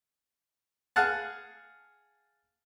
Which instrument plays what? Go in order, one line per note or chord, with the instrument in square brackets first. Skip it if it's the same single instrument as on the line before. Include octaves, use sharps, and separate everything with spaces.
[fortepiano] G#4 F5 F#5 A5